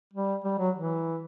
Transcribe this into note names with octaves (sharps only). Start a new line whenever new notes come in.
G3
G3
F#3
E3